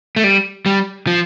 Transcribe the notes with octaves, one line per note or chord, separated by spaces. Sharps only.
A3
G3
G3
F3